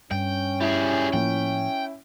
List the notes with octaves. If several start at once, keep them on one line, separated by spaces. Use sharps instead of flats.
G2 C#4 G5
G3 E4 G#4
A2 F3 A#3 G5